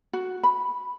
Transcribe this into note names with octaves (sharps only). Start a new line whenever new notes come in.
F#4
B5